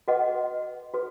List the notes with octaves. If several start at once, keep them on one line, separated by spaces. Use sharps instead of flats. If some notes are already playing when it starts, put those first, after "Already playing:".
F#4 B4 D#5 F#5
F#4 B4